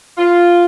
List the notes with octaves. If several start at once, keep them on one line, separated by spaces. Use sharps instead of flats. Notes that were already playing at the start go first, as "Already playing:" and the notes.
F4